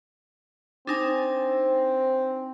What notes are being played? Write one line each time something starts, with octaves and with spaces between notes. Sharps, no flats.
C4 D4 D#4 G#5